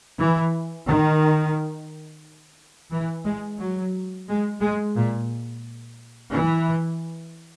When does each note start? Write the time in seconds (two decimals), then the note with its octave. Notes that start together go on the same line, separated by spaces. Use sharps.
0.19 E3
0.87 D#3
2.92 E3
3.25 G#3
3.58 F#3
4.27 G#3
4.60 G#3
4.95 A#2
6.31 E3